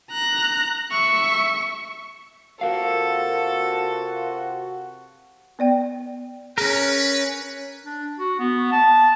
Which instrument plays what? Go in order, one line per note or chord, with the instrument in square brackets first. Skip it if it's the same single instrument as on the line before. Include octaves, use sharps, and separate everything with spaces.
[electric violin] A#5 F#6
E5 C#6
[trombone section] C3 F4 F#4 [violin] A4 [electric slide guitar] A#4 F5
[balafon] B3 D5 G5
[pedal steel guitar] C#4 A#4 [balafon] G#4 [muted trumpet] B4
[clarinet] D4
F#4
B3
A5